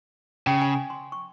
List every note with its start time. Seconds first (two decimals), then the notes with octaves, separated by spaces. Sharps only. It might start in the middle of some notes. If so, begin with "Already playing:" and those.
0.47 C#3 G5
0.61 G#5
0.75 G#5
0.90 C6
1.12 C#6